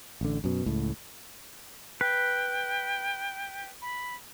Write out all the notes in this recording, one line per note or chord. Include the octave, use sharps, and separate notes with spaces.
A1 D3
F#2 B2
C#2 A2
B4 G5
B5